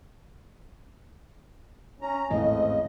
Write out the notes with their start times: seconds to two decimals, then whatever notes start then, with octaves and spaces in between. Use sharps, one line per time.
2.01 C#4 A#5
2.30 G#1 E2 A2 C#3 A3 C4 D#5